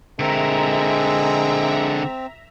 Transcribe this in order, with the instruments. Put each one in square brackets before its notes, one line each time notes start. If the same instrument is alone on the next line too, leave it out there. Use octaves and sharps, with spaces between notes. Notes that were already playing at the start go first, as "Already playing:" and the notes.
[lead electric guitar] D3 A#4 [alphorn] G#3 [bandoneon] C4 [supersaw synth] E5 A#5